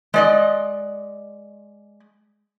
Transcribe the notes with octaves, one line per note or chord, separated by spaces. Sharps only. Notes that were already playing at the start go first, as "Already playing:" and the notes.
G#3 D5 D#5